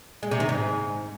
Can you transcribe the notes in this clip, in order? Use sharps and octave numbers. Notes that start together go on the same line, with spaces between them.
G#3
C3
D#3
G#2